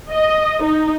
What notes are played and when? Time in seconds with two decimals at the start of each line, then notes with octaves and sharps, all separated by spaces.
0.11 D#5
0.63 D#4